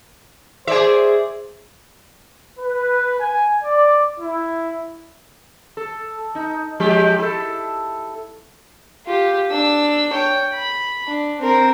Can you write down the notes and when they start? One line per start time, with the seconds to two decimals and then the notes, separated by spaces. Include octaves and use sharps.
0.67 G#4 C5 D5 E5
2.60 B4
3.19 G#5
3.62 D5
4.18 E4
5.77 A4
6.35 D#4
6.80 F3 G#3 G4
7.18 E4 A4
9.06 F4 G4
9.50 D4 E6
10.13 C#5 G5
10.53 B5
11.07 D4
11.40 C4 A#4